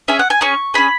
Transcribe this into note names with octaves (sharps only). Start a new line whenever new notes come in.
C#4 G#4 E5
F#5
G#5
C#4 G#4 C#6
C#4 G#4 B5